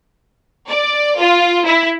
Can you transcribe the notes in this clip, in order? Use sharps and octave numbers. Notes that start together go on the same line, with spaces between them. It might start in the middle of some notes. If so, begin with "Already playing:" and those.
D5
F4
E4